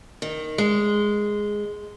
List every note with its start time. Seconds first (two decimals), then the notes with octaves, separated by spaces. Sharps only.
0.22 D#3
0.58 G#3